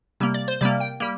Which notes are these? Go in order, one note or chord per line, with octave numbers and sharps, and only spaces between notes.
C3 G3 A#3
D5
C5
C3 G3 A#3 D5
G5
G3 A#3